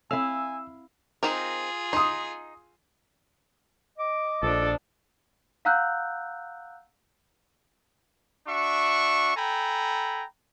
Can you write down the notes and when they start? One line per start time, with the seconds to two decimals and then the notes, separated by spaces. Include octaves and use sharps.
0.11 C4 E4 A4 C#5 F5 G#5 E6
1.23 C4 D#4 F4 G#4 A#4
1.93 D#4 C6 D#6
3.98 D#5 D6
4.43 A#1 F3 D4 A4
5.65 F5 F#5 A#5 E6 F#6 G6
8.48 D4 F#4 E5 C#6
9.36 A4 G5 G#5 A#5 B5